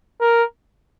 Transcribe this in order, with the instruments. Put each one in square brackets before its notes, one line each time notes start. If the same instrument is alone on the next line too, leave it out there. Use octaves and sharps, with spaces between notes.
[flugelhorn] A#4